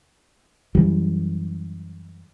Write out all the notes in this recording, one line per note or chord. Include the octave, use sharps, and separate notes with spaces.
F#2 E3 G3